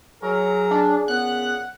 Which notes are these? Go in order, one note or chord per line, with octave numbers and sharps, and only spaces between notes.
F#3 G#4 A#4
D4
A#2 C#3 B3 F#5 F#6